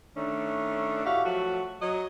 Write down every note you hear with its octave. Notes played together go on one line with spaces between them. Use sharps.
D#3 A3 C#4 D4
A2 F#4 G4 E5 F5
F3 F#3 A3 F#4
F#3 D#5